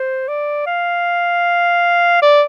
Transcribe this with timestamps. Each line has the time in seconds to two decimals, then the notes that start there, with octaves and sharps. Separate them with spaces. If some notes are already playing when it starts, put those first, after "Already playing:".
Already playing: C5
0.28 D5
0.67 F5
2.22 D5